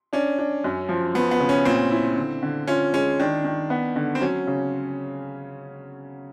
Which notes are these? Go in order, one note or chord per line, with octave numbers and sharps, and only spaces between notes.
C#4 D4
D4
F#2
F3
F3 B3
B3
C#3
C#4
A#2 C4
E4
D3
D3
C#4 F4
G#3 C#4
D#3 D4
D#3
B3
D3
C4
F#3 C#4
C#3